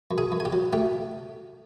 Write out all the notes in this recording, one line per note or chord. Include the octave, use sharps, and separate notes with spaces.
F#2
G#4 G#5
F#2
G#5
G4 G5
F#3
A3 G4 G5